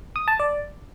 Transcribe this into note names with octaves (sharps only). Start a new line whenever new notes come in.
D#6
A5
D5